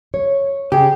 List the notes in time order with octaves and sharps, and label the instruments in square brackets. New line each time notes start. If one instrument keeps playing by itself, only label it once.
[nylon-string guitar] C#5
[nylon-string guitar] C#3 [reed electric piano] C#4 G#4 [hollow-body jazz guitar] G4